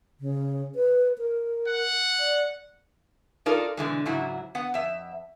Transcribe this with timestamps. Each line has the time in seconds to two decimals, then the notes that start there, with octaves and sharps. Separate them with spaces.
0.20 C#3
0.75 B4
1.18 A#4
1.67 F#5
2.20 D5
3.46 D#4 F4 A4 A#4 D5
3.77 B2 D3 E3 G#3
4.06 G#2 C#3 F#3 E4 F#4
4.55 B3 F#5
4.74 F2 E5